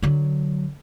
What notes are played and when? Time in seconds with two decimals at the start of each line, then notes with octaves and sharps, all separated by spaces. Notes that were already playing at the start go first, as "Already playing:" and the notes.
0.03 D3 F#3